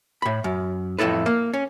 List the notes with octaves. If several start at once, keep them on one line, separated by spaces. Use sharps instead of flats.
A2 B5
F#2
F2 A2 E4 A4 B4
A#3
C#4